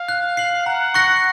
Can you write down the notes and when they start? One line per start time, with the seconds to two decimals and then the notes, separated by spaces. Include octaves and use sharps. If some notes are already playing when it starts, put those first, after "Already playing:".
Already playing: F5
0.09 F#6
0.37 C7 F#7
0.66 F#5 A#5
0.94 C#6 F#6 A#6 C#7